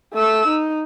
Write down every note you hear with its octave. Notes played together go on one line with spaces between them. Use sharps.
A3 E6
D#4